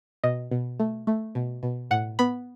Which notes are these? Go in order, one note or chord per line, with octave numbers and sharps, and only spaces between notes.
B2 D#5
B2
A3
A3
B2
B2
A2 F#5
B3 B5